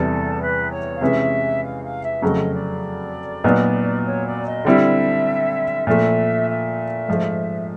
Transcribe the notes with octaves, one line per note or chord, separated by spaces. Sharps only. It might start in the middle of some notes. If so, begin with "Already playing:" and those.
Already playing: E2 C3 E3 G3 A4
B4
C#5
F5
C3 E3 G#3 C#4 E5
F5
F5
E5
F2 C#3 F#3 A3 D#5
D5
A#2 F#3 B3 D#4
C#5
D5
D#5
D3 G3 C4 E4 E5
A#2 F3 A3 E5
E5
G#2 F3 A3